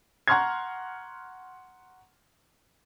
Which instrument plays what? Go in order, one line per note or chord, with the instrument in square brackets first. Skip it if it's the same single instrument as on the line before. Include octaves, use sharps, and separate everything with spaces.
[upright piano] F#5 A#5 C6 C#6 F6 G#6